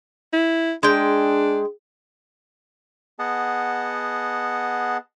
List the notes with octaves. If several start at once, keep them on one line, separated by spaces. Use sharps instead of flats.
E4
G#3 D4 G5
B3 G#4 D#5 F#5 A5